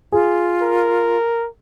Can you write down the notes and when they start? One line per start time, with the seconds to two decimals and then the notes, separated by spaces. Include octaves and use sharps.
0.12 F4 G#4
0.62 A#4